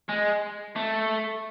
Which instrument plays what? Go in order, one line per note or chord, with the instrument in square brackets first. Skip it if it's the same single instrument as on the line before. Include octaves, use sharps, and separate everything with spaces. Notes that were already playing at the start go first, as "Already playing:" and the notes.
[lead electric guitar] G#3
A3